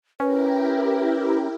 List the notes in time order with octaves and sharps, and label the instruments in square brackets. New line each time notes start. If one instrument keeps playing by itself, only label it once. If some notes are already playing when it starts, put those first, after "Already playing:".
[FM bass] C#4 [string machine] E4 G4 A#4 [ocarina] B4